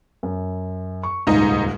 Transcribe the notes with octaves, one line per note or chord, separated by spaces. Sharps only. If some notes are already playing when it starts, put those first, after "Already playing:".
F#2
C#6
D#1 C#2 G#2 D#4